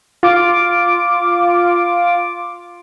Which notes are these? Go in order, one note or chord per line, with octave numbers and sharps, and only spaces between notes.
F4 D6